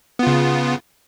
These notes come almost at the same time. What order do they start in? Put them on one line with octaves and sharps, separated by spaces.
B3 F4 C#3